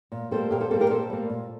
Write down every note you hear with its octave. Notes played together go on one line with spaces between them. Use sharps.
A#2
G3 A#3 A4 C5
A#2 G4 A#4
A4 C5
G3 A#3 A4 C5
G4 A#4
A#2 A4 C5
G3 A#3
A#2